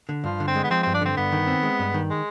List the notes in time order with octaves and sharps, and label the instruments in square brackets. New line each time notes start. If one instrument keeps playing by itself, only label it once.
[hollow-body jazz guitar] D3
[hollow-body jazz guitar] G2 [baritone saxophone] F3
[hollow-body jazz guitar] D3
[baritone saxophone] C4
[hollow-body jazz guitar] G#3
[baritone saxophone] B3
[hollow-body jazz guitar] F3 [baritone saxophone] C4
[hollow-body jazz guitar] G2 [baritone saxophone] C4
[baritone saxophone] D4
[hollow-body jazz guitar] D3 [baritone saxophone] C4
[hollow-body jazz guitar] G2 [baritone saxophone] B3
[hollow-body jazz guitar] D#3
C4
G#3
G2
D#3
[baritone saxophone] G#3